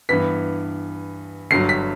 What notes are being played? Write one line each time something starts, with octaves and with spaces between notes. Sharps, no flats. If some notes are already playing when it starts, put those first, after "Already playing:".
G2 E3 B3 B6
G1 G2 F#3 C7
B6